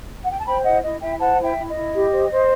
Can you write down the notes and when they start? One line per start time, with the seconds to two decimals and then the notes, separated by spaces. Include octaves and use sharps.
0.23 F#5
0.31 G5
0.38 A5
0.45 C5 G5 B5
0.64 E4 D#5 F#5
0.82 E4 D#5
1.00 E4 E5 G5
1.19 C5 F#5 A5
1.38 E4
1.44 E5 G5
1.56 E4
1.68 D#5
1.75 E4
1.93 G4
2.11 C5
2.30 C5